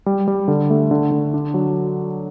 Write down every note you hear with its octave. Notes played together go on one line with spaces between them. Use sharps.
G3
G3
D3
A3
D3
D3
D4
F#3